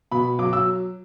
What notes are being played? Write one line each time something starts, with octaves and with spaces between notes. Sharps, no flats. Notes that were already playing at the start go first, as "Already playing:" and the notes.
B2 B5
F#3 D6
E6